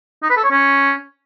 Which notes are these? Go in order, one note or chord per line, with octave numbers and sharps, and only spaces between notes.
D#4
B4
A4
C#5
C#4